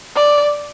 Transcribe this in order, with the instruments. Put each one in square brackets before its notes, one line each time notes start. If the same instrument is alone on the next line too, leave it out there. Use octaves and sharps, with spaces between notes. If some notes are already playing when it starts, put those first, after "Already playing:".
[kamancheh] D5